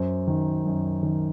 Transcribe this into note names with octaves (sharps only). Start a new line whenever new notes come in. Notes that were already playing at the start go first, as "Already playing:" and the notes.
Already playing: F#2 C5
D#3
F#2
D#3